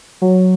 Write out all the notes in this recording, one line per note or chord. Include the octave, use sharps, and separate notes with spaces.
F#3